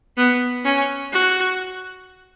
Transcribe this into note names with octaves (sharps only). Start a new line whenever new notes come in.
B3
C#4
F#4